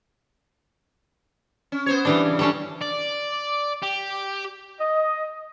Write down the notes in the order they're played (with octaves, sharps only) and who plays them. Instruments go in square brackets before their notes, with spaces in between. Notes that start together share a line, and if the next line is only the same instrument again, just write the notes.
[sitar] C#4
B3 C5 C#5
[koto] E3 G3 D4 [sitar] B3
[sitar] C#3
[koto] G3 C#4 D4 [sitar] A4
[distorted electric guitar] D5
G4
[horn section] D#5